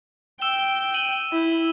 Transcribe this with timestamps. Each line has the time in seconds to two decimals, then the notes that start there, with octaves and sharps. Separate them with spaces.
0.41 G5 E6 E7 G7
0.94 D#7 F#7 G7
1.32 E4